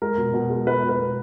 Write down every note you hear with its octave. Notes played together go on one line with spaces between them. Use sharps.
G#3 A#4
B2
B2
G#3
G#3 B4
B2
B4
B2